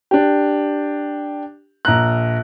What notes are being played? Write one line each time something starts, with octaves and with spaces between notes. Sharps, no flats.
D4 G4
A#1 A#5 F#6